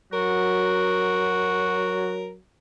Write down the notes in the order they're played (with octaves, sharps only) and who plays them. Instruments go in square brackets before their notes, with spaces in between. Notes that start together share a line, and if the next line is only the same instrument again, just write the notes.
[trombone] F#3 [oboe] F#4 [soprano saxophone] A#4